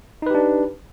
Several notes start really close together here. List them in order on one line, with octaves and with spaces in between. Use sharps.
D#4 B4 G4 D4